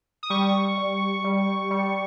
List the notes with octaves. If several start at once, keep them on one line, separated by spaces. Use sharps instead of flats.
D#6
G3 C#6
G3
G3
G3